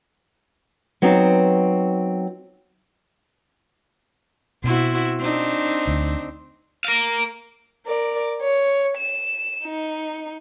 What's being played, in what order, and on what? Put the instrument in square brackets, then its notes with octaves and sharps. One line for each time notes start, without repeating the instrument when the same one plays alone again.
[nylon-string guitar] F#3 B3 C4 D#4
[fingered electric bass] B2 [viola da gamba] C4 E4 F#4
[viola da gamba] C4 D4 D#4
[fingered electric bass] D2
[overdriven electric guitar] A#4 F5
[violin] A#4 D5
C#5
E7
D#4